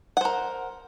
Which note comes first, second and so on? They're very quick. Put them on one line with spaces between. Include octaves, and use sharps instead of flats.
F#5 C5 A#4